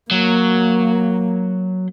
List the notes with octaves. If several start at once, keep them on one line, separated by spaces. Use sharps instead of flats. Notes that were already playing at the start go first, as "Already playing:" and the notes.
F#3 A#3